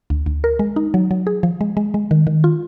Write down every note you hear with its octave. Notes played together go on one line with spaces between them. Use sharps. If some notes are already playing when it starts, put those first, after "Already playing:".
D2
D2
A#4
G#3
D#4
F#3
F#3
G#4
F3
G#3
G#3
G#3
D#3
D#3
F4